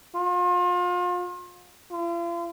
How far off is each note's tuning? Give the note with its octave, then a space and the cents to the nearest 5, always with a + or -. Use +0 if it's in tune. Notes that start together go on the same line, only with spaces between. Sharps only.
F4 +35
F4 -40